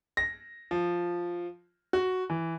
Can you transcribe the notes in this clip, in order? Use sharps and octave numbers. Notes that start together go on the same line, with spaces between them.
A#6
F3
F#4
E3